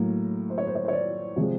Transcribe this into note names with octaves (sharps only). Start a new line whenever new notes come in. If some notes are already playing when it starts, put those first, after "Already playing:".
Already playing: A2 F#3 A#3
C5
C#5
C5
C#5
C5
C#5
D5
C3 F3 G#3